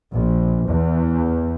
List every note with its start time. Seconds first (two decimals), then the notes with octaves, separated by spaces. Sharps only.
0.15 A#1
0.69 E2